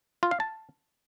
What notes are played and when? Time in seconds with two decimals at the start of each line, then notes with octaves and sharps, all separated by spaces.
0.23 F4
0.31 F5
0.40 A5